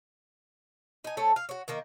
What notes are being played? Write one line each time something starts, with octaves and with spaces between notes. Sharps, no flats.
D#4 G#5
A3 A4 C5 C#5
F5
F#4 C#5
D#3 A#3 A#4 D#5